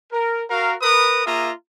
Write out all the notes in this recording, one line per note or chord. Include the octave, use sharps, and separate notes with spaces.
A#4
F#4 A#4 F5
A#4 B4 D#6
A#3 F4 G#4 E5 A#5 D#6